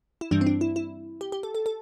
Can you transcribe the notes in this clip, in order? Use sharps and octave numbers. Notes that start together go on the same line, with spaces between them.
E4
G2 E3 G3 D4
C4
D4
E4
E4
G4
G4
A4
A4
A4